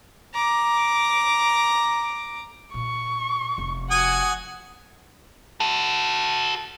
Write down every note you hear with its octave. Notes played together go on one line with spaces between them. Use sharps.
A#5 D6
A#2 C#6
F1
F#4 F#5 G#5 D#6
F#4 A4